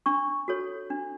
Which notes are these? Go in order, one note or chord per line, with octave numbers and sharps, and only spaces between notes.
D4 C#6
F#4 A4 C#5
D4